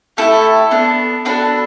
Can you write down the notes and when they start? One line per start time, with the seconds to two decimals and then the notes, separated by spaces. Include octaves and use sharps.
0.17 A3 E4 G4 A4
0.71 B3 D4 A4
1.25 B3 D4 F#4 A4 B4